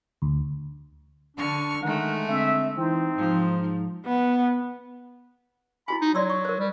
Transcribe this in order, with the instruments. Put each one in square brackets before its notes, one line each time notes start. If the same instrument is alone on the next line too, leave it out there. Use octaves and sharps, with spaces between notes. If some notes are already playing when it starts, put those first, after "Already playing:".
[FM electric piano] D2
[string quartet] D3 C#6 F6 [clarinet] D4
[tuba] D#3 [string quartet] G#3 A3 [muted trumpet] A#4 [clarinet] F#5
[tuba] D3 [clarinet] C4 [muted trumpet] E5
[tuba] E3 [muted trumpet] C4 [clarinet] D#4
[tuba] G#2 [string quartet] F3
[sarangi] B3
[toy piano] E4 F#4 G#5 [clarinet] B5
[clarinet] D#4
[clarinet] F#3 [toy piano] D5 C6 E6
[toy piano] C#6
A#4 C5
[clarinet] G3